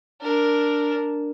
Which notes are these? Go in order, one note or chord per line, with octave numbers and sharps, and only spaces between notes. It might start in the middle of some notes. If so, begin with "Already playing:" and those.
D4 A#4